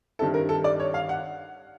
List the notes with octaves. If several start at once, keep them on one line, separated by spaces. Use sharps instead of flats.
G2 D#3 G3 C4 E4 A4
A#4
A4
D5
C#5
F5
F#5